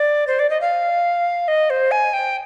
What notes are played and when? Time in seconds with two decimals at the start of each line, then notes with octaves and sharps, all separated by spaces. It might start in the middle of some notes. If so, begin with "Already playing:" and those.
Already playing: D5
0.27 C5
0.39 D5
0.50 D#5
0.61 F5
1.48 D#5
1.70 C5
1.91 G#5
2.13 G5